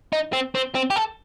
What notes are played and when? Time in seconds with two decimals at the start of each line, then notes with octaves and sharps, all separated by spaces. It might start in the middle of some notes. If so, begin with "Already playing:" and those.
0.13 D#4
0.33 C4
0.55 C4
0.75 C4
0.90 G4
0.96 A4